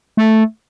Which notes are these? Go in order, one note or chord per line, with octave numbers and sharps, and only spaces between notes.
A3